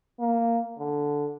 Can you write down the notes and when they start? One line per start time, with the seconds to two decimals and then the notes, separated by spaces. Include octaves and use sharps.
0.20 A#3
0.79 D3